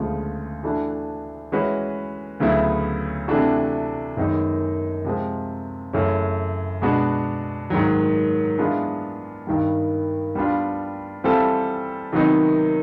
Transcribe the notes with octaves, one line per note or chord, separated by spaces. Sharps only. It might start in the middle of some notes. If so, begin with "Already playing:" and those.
Already playing: D2 C#3 F3 G#3 B3
E3 A3 D4 F#4
E3 G#3 C#4 F#4 B4
D2 C#3 F#3 B3 E4
C3 E3 A3 D4 F#4
F#2 D#3 G#3 B3 D#4
C3 F3 G#3 C4
F#2 C#3 E3 A3 C#4
B2 G#3 B3 D4 F#4
G#2 D#3 F#3
E3 G#3 B3 D4 F4
G2 D#3 G3
G3 B3 D4 F4
E3 G3 C4 F4 A4
C3 D#3 F#3 B3 D#4